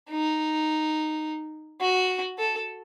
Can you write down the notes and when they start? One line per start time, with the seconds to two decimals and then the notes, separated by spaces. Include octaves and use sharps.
0.11 D#4
1.81 F#4
2.38 A4